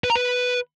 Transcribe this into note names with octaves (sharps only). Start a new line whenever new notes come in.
B4
A#5
B4